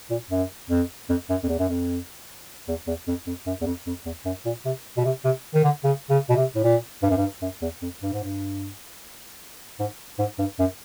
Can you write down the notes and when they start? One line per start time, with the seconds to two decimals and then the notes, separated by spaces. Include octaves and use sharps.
0.10 A#2
0.31 F#2
0.70 F2
1.09 F2
1.30 F#2
1.44 F2
1.49 E2
1.59 F#2
1.68 F2
2.68 E2
2.87 E2
3.07 F2
3.27 F2
3.46 F#2
3.61 E2
3.66 F2
3.87 F2
4.05 E2
4.25 F#2
4.45 A#2
4.65 C3
4.97 B2
5.05 C3
5.25 C3
5.54 D#3
5.64 D3
5.84 C#3
6.10 C#3
6.29 B2
6.36 C3
6.55 A2
6.64 A#2
7.02 G2
7.10 F#2
7.17 G2
7.42 F#2
7.62 E2
7.82 F2
8.02 G2
8.13 G#2
8.24 G2
9.80 G#2
10.19 G#2
10.39 G2
10.59 F#2